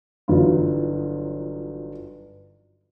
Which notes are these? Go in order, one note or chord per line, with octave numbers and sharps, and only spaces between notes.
G1 E3 F#3 D#4 F4